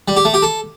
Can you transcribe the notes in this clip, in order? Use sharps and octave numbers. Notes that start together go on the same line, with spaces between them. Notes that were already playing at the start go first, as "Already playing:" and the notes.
G3
G4
A3
G4
A4